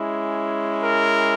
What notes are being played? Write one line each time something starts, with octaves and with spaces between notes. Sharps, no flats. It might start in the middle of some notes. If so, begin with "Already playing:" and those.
Already playing: G#3 C#4 E4
A#4